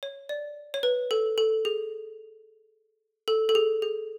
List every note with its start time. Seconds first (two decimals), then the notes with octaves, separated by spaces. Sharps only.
0.03 C#5
0.29 D5
0.74 C#5
0.83 B4
1.11 A4
1.38 A4
1.65 G#4
3.28 A4
3.49 A4
3.55 G#4
3.82 G#4